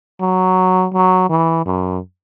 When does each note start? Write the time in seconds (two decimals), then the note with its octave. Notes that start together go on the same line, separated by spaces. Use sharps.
0.21 F#3
0.94 F#3
1.30 E3
1.66 F#2